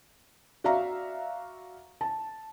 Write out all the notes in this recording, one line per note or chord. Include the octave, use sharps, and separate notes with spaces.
F#4 D5 E5 F5 A#5
A5